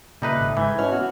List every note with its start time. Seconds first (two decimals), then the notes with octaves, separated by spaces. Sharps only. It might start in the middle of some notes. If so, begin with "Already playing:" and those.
0.22 A#2 C#3 G3 A3 D#4 B4
0.37 G#1
0.57 G#2 E3 G6 G#6
0.78 B2 C#4 E4 C#5 F6
0.92 B3 F#4